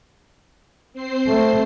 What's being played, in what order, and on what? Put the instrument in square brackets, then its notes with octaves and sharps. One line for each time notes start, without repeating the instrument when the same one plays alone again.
[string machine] C4 C5 C7
[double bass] A3